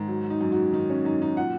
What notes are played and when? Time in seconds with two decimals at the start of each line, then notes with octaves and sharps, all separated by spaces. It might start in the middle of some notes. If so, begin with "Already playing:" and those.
Already playing: G#2 D#3
0.08 F#3
0.30 D#4
0.41 F#2
0.52 F#4
0.73 D#3 D#4
0.90 C#4
1.05 F#2 D#4
1.22 D#4
1.37 A#2 F#5